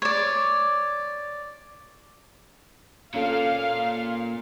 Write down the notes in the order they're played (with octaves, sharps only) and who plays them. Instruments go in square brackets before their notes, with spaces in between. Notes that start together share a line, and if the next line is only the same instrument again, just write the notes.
[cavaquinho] C#5 D5
[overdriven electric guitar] A#2 [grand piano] C#4 A4 [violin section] F5